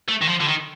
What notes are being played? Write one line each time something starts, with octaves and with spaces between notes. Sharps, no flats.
A3
D#3
F3
D3
D#3